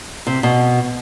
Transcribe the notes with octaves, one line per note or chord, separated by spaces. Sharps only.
C3
B2